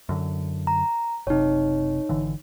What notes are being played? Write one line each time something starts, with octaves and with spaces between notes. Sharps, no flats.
F#2 D3
A#5
F#1 C3 D#4 C#5
G#1 D3 E3